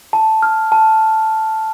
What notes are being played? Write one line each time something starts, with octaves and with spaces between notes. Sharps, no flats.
A5
F6
A5